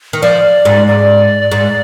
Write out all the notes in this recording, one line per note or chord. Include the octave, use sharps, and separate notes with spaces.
D#3
F3 D5
G#2
D5
G#2